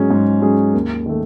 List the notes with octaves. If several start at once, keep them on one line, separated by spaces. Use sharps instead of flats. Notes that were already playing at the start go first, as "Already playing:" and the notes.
Already playing: G#2 F#3 C#4 G#4
G#2
F#3 C#4 G#4
D#2
D#3 A3